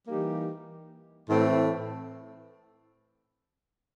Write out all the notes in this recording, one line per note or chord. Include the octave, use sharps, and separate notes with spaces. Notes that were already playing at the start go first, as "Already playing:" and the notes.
E3 G3 A#3 D#4 G4
A2 E3 A3 C4